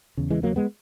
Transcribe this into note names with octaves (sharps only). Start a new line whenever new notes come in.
E2 C#3
E3 G#3
F#3 A#3
G#3 B3